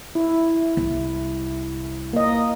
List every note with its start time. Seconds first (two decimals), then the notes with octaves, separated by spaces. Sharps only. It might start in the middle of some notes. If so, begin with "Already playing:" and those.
0.15 E4
0.77 C2
2.13 A#3 D#5